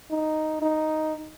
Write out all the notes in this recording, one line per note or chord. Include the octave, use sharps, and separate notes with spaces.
D#4
D#4